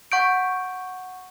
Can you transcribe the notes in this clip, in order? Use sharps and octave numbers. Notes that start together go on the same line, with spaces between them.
F#5 C#6 G6 D7